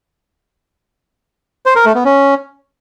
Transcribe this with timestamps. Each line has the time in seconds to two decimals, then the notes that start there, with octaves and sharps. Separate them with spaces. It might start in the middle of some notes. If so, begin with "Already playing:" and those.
1.66 C5
1.76 A#4
1.85 A3
1.95 B3
2.05 C#4